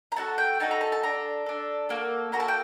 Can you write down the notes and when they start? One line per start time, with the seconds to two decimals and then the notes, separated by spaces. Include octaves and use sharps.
0.12 A#5
0.16 A3 D#4 F#4 A4 A5
0.38 G5
0.60 A3 D#4 F#4 A4 A5
0.71 A#5
0.81 A5
0.92 A5
1.03 D4 A4 A#5
1.46 D4 A4
1.89 A#3 F#4 A4
2.32 A#3 F#4 A4 A#5
2.40 A5
2.48 G5